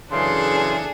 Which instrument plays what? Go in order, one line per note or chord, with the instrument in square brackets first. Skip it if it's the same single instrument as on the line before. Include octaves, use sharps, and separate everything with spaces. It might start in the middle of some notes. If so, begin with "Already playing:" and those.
[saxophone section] F#2 C#3 E3 [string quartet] D4 G#4 A4 [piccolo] C6